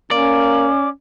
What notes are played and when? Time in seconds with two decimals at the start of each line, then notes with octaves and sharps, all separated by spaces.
0.11 A#3 C#4 D5